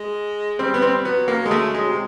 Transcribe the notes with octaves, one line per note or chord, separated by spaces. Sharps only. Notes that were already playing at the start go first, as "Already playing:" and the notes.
Already playing: G#3
G3 C4
B3
C4
F#3 B3
A#3
G#3
A3
G#3
C3